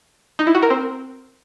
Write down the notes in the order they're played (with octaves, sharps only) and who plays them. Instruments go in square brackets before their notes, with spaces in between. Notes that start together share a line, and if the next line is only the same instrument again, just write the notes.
[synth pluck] D#4
E4
F#4
A#4
C4